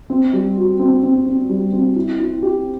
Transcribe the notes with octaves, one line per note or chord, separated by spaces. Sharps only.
C4
G3
F#4
C4
C4
C4
G3
C4
E4
E4
G4